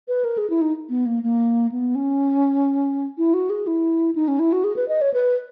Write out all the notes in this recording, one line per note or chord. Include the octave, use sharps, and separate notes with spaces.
B4
A#4
G#4
E4
D#4
B3
A#3
A#3
B3
C#4
E4
F#4
G#4
E4
D#4
C#4
E4
F#4
G#4
B4
D#5
C#5
B4